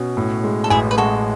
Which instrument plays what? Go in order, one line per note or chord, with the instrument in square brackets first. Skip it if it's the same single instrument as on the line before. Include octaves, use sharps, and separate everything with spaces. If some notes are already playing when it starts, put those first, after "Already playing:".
Already playing: [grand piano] B2 C#4
A2
G#3
[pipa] A4
[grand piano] A1 [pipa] E4 G#4
[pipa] B4
[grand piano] G#3 [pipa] F#4 A4